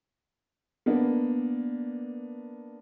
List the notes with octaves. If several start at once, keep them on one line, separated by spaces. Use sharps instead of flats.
A#3 B3 D4